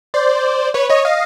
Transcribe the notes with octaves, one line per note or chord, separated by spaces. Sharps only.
C5 D5
B4 C#5
C#5 D#5
D#5 F5